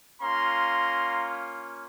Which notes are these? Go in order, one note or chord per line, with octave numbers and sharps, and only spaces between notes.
A#3 C#4 F4 A#5 C6